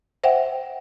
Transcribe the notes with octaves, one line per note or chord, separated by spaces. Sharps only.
C5 E5 F#5 G5